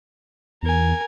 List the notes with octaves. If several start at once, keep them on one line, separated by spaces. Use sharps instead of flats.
E2 A#4 G#5